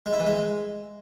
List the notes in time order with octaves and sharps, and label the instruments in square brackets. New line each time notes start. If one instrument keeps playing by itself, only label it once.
[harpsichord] G#3
E4
E3
G#3